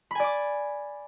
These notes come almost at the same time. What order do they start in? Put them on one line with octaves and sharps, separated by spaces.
B5 G#5 D5 D6